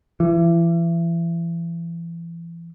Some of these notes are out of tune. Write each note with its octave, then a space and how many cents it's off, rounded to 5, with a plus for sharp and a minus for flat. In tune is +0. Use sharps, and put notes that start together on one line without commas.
E3 +35